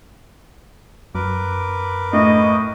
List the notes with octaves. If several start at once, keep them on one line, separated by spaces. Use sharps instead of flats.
F#2 A#4 B4 D6
A2 D#5